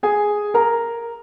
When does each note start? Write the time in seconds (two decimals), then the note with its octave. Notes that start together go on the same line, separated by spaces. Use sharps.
0.03 G#4 G#5
0.54 A#4 A#5